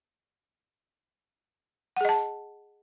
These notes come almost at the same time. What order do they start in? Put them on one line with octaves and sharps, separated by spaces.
F#5 G#4 D#5 A5